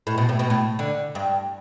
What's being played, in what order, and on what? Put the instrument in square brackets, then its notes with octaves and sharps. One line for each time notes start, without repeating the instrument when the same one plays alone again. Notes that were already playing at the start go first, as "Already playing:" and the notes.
[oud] A2
B2
A2
B2
A2
D3
G2